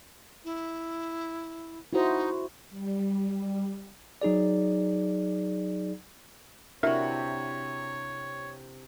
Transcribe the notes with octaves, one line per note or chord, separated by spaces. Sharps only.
E4
D#4 E4 F#4 C5
G3
F#3 D#4 G#4 D5
C3 D4 E4 F#4 A#4 C#5 E5